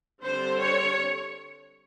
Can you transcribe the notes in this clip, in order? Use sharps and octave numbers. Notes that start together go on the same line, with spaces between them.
D3 G3 C4 C5
C#5